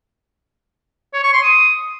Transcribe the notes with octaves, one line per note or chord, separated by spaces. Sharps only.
C#5
C#6
C6
D#6